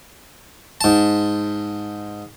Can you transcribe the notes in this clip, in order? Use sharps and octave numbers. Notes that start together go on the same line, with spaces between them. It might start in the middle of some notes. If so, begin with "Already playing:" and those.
G#2 A5